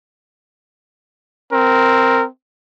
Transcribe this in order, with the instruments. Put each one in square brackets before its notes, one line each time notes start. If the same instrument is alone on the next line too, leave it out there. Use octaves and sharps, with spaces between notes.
[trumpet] C4 [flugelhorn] A#4